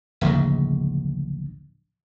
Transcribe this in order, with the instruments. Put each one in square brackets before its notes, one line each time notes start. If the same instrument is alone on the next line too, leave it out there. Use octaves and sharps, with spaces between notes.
[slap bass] D1 A#1 G#2 C#3